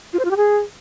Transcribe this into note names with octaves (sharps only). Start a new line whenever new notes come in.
F4
C5
F4
G4
G#4